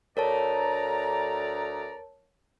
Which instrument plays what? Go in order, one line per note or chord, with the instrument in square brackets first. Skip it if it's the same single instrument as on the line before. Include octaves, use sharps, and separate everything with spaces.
[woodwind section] D2 D5 A#5 [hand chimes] A#4 C#5 A5